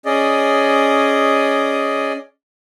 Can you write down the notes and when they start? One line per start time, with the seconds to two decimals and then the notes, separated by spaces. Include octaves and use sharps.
0.05 C#4 G#4 D5 D#5